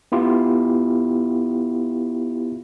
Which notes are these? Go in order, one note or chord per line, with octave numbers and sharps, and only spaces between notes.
B3 E4 F4 G4